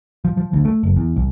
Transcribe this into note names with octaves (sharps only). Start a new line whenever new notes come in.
F3
F3
D2
A3
F#1
E2
C2